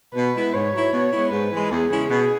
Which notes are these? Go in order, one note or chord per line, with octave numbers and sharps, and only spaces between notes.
B2 B4
G#3 B3 E4
G#2 C#5
F#3 E4
B2
G#3 B3 E4
G#2 B4
E3 G#3
E2 G#4
C#3 G#3 C#4 E4
B2 G#4